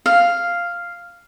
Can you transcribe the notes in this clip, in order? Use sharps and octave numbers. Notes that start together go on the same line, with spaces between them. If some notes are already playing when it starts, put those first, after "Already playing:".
F5